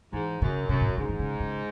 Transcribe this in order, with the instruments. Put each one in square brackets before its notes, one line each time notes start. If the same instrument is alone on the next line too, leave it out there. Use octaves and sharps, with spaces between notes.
[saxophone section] G#2 [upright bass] E3
[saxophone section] F#2 [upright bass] C#3
[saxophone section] F#2 [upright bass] C3
[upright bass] A2
C3
[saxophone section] G#2 [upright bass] C#3
[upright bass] D#3
C#3
C#3